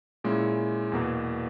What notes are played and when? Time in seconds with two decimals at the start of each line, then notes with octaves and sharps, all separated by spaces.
0.24 A#2 G#3 C#4 E4
0.92 E2 B2 A#3